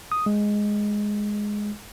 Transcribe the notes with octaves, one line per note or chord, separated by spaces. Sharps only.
D#6
G#3